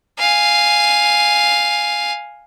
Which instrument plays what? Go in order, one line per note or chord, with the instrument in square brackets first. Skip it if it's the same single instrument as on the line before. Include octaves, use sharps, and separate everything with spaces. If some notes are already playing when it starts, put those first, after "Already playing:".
[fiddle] F5 G#5